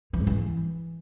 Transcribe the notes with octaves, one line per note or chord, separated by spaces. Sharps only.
E3
G#2
E3